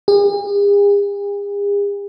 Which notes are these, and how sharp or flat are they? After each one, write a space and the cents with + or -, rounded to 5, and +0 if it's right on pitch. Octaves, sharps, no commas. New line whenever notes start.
G#4 -45